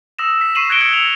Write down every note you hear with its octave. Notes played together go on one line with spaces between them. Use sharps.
D#6 E6 A#6 E7
E6 B6
C#6 C7 D#7 E7 F#7
F#6 G#6 A#6 C#7 D7 G7
E6 G#6 C#7
F7